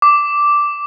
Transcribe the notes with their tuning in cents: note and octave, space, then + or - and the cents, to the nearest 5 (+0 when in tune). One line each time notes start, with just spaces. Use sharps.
D6 -5